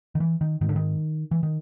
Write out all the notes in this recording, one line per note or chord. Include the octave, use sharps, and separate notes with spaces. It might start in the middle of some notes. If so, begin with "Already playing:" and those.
D#3
E3
D#3
G#2 D#3
D3
D#3
E3
D#3